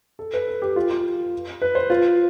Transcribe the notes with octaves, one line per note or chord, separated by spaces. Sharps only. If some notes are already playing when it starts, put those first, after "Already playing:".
A4
B4
A4
G4
F4
F4
B4
C5
F4